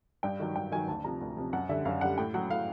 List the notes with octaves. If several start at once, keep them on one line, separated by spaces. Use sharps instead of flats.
G2 G5
D#3 F#3
G2 G5
D#3 F#3 G#5
D2 A5
C3 F3 A#5
D2
C3 F3
F#2 F#5
D3 G3 E5
F#2 F5
D3 G3 F#5
A2 G5
F#3 F#5
A2 F5